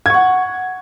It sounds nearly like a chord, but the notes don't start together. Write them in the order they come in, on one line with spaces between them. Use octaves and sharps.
G#6 C#6 F#5